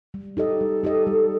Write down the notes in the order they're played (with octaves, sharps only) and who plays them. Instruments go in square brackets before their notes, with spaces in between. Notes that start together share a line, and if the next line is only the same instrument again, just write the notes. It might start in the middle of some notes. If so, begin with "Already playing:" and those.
[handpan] G3
[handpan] D#4 G4 D#5 [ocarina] A4
[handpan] G3
D#4 G4 D#5
G3